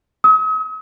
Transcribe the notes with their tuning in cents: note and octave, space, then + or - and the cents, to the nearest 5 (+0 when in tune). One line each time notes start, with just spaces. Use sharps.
D#6 +45